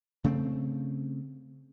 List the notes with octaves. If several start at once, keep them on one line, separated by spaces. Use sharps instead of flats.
C#3 A3 B3 C4